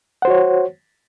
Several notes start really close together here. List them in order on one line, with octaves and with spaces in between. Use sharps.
F#5 C5 F#4 C#5